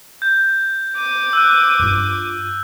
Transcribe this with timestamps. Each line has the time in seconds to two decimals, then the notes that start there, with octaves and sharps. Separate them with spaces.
0.22 G6
0.95 D6 D#7
1.33 E6 F#6
1.79 G2 F4